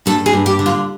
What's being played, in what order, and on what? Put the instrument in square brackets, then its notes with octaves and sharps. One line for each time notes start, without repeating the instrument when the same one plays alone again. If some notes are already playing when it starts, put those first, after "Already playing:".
[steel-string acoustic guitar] G2 A4
G#4
G2
G4
D3
F4